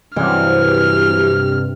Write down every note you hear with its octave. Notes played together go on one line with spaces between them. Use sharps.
G2 C3 E3 F#3 F6